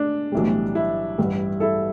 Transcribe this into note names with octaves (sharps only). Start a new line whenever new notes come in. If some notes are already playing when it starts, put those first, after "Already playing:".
Already playing: D4
B1 A2 E3 G3
E4
A1 G2 G3
E4 A4